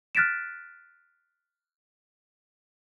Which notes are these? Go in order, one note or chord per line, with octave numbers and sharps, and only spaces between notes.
F6 F#6 A6 B6 D7 E7